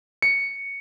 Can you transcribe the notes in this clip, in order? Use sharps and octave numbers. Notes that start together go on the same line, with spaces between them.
C#7